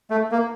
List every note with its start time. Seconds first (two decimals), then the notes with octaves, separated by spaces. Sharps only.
0.10 A3
0.32 A#3